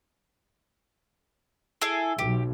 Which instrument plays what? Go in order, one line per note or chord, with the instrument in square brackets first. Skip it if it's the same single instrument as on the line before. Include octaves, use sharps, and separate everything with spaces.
[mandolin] E4 G#4 A4
[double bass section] B1 [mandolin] G4